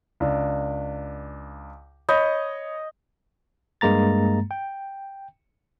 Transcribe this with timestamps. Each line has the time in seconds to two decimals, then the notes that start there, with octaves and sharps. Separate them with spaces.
0.20 C#2 D4
2.09 C#5 D#5 B5 G6
3.81 G2 G#3 A#3 A#5 A6
4.51 G5